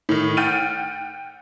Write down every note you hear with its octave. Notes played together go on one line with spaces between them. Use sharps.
A2 D#3
F#5 G5 F6 G6 A6 D#7